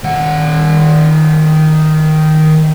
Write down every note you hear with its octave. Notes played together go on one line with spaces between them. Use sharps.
D#3 F#5